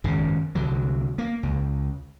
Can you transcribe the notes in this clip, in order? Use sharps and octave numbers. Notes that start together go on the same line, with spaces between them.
G#1 F#2 C#3
C2 D3 F#3
A#3
C#2